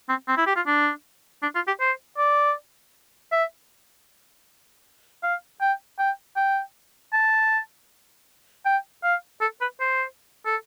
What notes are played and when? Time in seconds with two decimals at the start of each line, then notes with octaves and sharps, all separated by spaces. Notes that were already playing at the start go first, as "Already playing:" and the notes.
0.09 C4
0.28 C4
0.37 E4
0.46 G4
0.56 F4
0.67 D4
1.43 D4
1.55 F4
1.67 G4
1.80 C5
2.18 D5
3.32 E5
5.23 F5
5.61 G5
5.99 G5
6.37 G5
7.13 A5
8.66 G5
9.03 F5
9.41 A4
9.61 B4
9.80 C5
10.46 A4